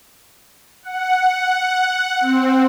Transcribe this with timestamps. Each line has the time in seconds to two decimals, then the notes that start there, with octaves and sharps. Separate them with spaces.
0.83 F#5
2.21 C4